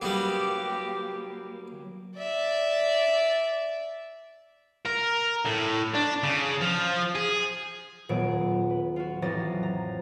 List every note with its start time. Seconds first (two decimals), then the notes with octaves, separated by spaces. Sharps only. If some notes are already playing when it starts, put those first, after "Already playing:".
0.02 F#3 G3 A#3 B3 G4
2.17 D5 E5
4.85 A#4
5.46 A2
5.95 D4
6.23 C#3
6.61 F3
7.15 G#4
8.09 D#1 A#2 F#3 B3 D7
8.70 B4
8.96 F4 F#4
9.22 A1 F2 F#3 A6 A#6
9.63 A#5